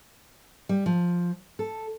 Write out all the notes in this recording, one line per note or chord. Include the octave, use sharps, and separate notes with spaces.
G3
F3
A4